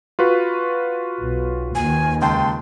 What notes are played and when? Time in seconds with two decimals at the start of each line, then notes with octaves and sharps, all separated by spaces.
0.19 F4 F#4 B4
1.20 B1
1.75 D#2 D#3 G#5
2.22 C#2 G5 A5 C6